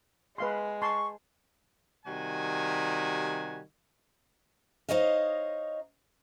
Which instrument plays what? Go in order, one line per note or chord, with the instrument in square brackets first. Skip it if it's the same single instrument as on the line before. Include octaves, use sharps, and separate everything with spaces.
[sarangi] G#3 [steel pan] B4 F5 C6
[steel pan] A5 C6 [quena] C#6
[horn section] C3 D#3 G3 F#4 G#5
[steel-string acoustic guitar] D#4 C5 C#5 D#5 F5